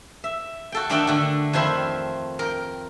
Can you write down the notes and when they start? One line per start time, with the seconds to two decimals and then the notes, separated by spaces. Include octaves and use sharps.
0.24 E5
0.72 F#4 A4 G5
0.90 D#3 A3 D4 F#4 E5 G5
1.07 D3 A3
1.53 F2 D#3 C5 E5 B5
2.39 A#4 G5